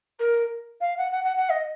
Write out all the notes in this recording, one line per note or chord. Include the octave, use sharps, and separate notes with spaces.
A#4
F5
F#5
F#5
F#5
F#5
D#5